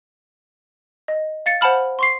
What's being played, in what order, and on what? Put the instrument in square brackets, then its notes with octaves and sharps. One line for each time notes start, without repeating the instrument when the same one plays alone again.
[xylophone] D#5
F5 A6 C#7
C5 F#5 A5 B5 F6
C6 C#6 C7